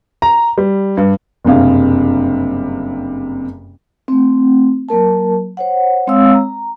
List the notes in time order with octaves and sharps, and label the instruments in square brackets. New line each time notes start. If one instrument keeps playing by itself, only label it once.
[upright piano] A#5
G3
G2
F#1 G2 C3 F5
[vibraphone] A3 C4
F#3 A#3 A#4 A5
C5 C#5 F#5
G#3 C4 C#5 F5 D#6 E6
A#5